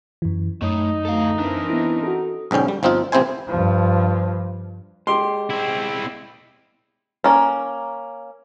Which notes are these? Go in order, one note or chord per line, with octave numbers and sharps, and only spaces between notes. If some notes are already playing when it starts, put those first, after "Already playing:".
F#2 E3
F#2 A3 D#4 C#5
D2 A4 F5
E3 C4 D4 A#4
B3 E4
F#4 A4
B1 G#2 D3 C#4 G5
G3
G1 F3 C4 D#4 F4
A1 C3 C4 E4 C5 G#5
G2 F3
G#3 G4 C6
C4 E4
A#3 C#4